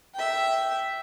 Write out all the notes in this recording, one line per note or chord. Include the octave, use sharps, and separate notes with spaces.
E5 G5